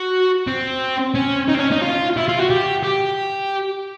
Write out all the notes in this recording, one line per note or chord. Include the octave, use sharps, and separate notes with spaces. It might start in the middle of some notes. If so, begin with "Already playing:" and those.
Already playing: F#4
C4
C#4
D#4
C4
C#4
D#4
F4
E4
F4
F#4
G4
G4